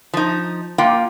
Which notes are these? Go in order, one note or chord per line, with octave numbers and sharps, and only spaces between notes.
F3 D#4
A#3 F4 G5